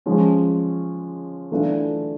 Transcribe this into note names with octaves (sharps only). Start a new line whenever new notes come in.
F3 G#3 C#4
E3 A3 D4 F4